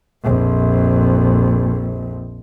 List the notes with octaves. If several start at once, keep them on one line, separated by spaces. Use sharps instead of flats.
A#1 F2